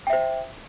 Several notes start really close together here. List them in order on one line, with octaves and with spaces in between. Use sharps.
G5 E5 C5